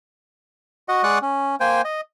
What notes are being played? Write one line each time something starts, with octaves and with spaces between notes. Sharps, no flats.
F#4 D#5 F#5
G#3 D5 F#5 C#6 D#6 F#6
C#4
A#3 C5 G5 G#5
D#5